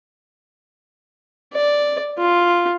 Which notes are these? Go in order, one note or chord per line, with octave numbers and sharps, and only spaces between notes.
D5
F4